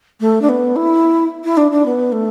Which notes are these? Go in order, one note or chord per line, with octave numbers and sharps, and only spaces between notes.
A3
D4
B3
E4
E4
D4
D4
B3
A3